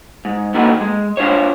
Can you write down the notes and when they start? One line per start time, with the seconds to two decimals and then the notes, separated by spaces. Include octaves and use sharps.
0.25 G#2
0.54 D3 D#3 A#3 F#4 A4 B4
0.81 G#3
1.17 D4 F4 C5 C#5